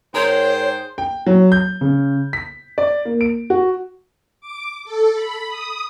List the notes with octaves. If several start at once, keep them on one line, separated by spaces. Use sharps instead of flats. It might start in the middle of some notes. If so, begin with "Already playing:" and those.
G#2 G#4 A#4 C5 C#5 G5
G5
F#3
G6
C#3
B6
D5
A#3
D7
F#4
D6
A4
B5
D#6